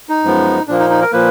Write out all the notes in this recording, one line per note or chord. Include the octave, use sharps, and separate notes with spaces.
D#4
F#2 F3 G#3 B3
A#2 F3 A#3 D4
D#4
D#4
A#4
A#2 F3 A#3 B4